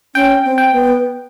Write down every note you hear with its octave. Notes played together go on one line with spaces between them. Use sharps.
C#4 G5
C4
G5
B3